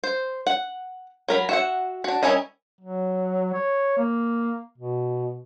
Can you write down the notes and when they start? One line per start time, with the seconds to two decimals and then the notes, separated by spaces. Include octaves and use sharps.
0.04 C5
0.47 F#5
1.28 F#3 A#4 B5
1.49 F#4 E5 F#5
2.04 D4 F#4
2.23 G3 C#4 E4 A#4 D#5
2.81 F#3
3.54 C#5
3.97 A#3
4.78 B2